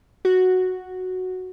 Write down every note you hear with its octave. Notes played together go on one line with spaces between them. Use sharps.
F#4